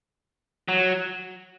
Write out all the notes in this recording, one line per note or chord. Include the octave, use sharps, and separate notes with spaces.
F#3